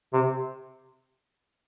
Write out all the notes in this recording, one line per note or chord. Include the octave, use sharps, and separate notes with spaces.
C3